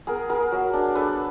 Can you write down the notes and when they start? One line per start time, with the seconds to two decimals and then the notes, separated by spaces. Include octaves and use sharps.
0.07 B3 G#4 A#4
0.30 B3 G#4 A#4
0.52 F#3
0.73 D4
0.95 D4 A4 B4